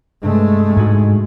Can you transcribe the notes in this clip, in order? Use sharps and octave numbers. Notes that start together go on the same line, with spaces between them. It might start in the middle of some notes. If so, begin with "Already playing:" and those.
G2 C3 G#3 A3
G#2 F#4 G#5